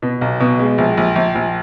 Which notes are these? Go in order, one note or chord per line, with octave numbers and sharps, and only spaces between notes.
B2
B1
B2
G#3
A#1
A#1
A#1
A#1